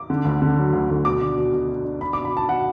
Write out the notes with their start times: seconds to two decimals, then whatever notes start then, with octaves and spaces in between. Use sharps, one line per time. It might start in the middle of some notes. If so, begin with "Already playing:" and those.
Already playing: D6
0.10 D3
0.25 D2
0.42 D3
0.57 F#3
0.73 D2
0.89 D2
1.05 B2 D6
1.21 D4
1.37 B2
1.53 B2
1.69 D4
1.85 D4
2.01 D4 B5
2.13 D6
2.17 B2
2.25 B5
2.33 D4 A5
2.49 B2 F#5